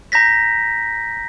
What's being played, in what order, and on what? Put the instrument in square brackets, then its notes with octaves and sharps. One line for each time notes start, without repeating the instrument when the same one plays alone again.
[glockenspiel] A#5 G6 A#6 B6